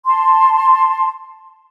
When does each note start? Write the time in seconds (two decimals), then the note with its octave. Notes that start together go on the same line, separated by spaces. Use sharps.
0.05 A5 C6